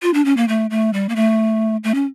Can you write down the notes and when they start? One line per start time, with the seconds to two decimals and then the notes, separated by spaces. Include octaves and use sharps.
0.02 F4
0.14 D4
0.25 C#4
0.37 A#3
0.48 A3
0.70 A3
0.93 G3
1.09 A#3
1.16 A3
1.84 A3
1.94 C#4